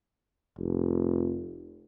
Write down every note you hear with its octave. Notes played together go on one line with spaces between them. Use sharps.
F1